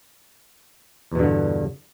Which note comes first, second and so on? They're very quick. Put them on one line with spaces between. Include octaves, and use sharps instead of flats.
E2 B2 G2 D3